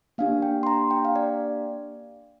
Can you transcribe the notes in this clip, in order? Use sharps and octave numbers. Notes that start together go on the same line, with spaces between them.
A#3 D4 G4 F5
G5
C6
A#5
G5
F5
D5